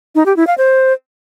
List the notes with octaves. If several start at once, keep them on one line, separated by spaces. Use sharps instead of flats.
D#4
G4
E4
F5
C5